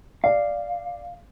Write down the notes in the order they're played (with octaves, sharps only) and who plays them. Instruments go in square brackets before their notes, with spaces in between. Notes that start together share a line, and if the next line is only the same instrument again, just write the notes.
[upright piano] D5 [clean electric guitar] F5